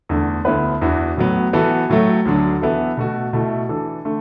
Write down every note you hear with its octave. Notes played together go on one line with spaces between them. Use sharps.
E2 D3 A3 D4
D2 D3 B3 E4 B4
E2 E3 D4 F#4
A2 F#3 B3
E3 B3 F#4 A4
A2 F#3 A3
D2 D3 F#3 D4
E3 B3 E4 A4
B2 A3 F#4
B2 A3 E4
E3 D4 A4
D3 A3